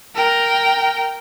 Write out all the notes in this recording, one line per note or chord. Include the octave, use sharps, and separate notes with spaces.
A#4 G5